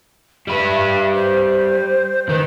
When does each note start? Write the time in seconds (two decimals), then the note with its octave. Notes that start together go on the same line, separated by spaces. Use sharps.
0.48 G3 B4 E5
1.14 C5
2.29 D#3 B4